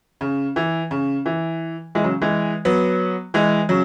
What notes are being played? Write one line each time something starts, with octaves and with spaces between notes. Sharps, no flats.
C#3
E3
C#3
E3
E3 G#3
C#3 F#3
E3 G#3
F#3 B3
E3 G#3
C#3 F#3